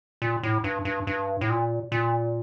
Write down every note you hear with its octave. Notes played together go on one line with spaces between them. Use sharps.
A#2
A2
G2
G2
G2
A2
A#2
A#2